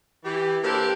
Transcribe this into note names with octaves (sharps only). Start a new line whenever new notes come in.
E3 G4
A#3 D4 G4 A4 B4 C5